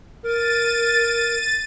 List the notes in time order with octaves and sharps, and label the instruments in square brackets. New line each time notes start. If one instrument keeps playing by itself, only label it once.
[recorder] A#4 [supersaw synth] A6 D#7